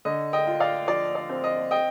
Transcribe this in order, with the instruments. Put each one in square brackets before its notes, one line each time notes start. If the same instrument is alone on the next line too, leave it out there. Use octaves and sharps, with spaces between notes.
[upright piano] D3 D#5
D#5 G5
F4
D5 F5
F3 D5
D5
C4
D#5
D#5 G5